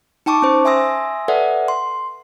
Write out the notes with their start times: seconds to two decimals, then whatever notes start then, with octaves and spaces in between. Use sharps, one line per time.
0.26 D#4 G5 A5 C#6 D6
0.42 C#4 C5
0.65 E5 G#5 C6 D#6 E6 A#6
1.28 A4 B4 D5 E5 F#5
1.68 C6